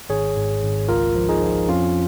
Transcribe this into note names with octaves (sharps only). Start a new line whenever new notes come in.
G#1 G#4 C#5
G#2
G#1
C#2 F4 A#4
F3
D#4 G#4
F3
F2 C#4 F4